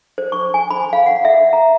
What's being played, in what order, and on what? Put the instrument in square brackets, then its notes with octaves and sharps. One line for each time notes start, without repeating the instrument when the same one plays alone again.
[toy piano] C5
C#6
G#5
B5
F5
F#5
E5
A#5